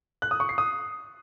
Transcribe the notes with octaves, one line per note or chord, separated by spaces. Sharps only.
F#6
D#6
C#6
C7
D#6